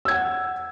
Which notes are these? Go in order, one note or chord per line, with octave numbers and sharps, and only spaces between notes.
F#5 E6 G#6